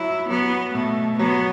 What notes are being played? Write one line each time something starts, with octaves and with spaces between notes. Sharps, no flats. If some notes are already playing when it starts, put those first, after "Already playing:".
Already playing: F#3 E4
F#3 B3
B2 A3
F#3 B3